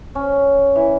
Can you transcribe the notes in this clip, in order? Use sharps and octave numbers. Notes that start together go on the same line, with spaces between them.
C#4
E3